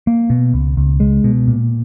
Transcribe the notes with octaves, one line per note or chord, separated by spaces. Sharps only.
A#3
B2
C#2
C#2
G#3
B2
A#2